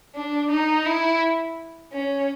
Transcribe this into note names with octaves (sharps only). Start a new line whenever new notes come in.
D4
D#4
E4
C#4